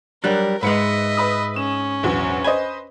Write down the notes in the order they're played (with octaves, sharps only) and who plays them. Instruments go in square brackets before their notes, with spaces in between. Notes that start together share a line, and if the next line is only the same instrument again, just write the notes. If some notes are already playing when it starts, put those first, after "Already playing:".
[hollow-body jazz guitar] F#3 G3 D4 [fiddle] A#4 [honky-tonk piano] F#6
[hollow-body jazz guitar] G#2 G#3 [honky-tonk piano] B4 C#7 [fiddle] D#5 E5
[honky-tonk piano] B4 B5 D#6
[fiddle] C#4 [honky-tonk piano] E7
[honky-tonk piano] A#1 E2 F#3
[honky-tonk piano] B4 C5 D#5 [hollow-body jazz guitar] G#5